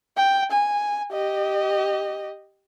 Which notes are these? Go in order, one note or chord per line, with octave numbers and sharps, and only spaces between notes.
G5
G#5
G4 D#5